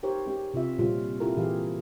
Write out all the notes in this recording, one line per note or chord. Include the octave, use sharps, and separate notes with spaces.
D#4 G4 A#4 C5 C#5
G#3 C#4 G4
C3 F4 E5
A#2 C#3 G3 C4 C#4 F4
E4 F4 G4 A4 A#4
A#2 E3 G4 G#4 F5